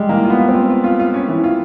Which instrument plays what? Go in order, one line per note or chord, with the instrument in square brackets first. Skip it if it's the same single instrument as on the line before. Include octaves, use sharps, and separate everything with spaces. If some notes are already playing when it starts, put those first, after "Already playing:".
Already playing: [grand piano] G3 G#3
[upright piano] E3 [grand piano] A#3
[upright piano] F4
[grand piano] B3
[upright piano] F4
[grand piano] C4
[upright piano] F4
F4
F4
F4
C#4
E3
F4